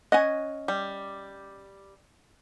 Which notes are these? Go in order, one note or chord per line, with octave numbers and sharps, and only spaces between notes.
C#4 D#5 F#5 G#5
G3